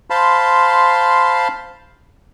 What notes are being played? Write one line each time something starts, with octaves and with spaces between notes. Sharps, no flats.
C5 F5 A5 B5 C6